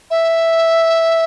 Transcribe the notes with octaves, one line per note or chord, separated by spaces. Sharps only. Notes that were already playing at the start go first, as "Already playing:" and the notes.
E5